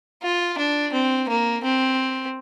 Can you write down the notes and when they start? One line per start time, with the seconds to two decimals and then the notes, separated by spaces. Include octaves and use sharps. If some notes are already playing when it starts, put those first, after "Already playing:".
0.23 F4
0.58 D4
0.93 C4
1.29 A#3
1.63 C4